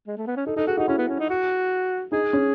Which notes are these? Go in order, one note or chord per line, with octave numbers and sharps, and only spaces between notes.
G#3
A3
B3
C#4
D#4 A4
D#4 A4
F#4 G#4
D#4 F#4
C#4 E4
B3
C#4
D#4
F#4
D#4 G#4
C#4